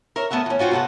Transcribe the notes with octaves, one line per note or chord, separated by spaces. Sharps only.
A#4 C#5 E5
A3 B3 B4 E5 F#5
E3 C#4
C#4 F4 F#4 C5 G5
C3 A3 B3 A4 F#5